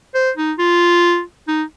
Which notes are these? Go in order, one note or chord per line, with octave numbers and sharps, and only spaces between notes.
C5
D#4
F4
D#4